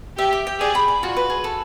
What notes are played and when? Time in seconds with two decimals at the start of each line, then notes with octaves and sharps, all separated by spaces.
0.18 G4 E5
0.33 G4
0.47 G5
0.60 G#4 D5
0.75 B5
0.88 D5
1.02 F4 F#4
1.17 B4
1.30 G#4
1.44 A4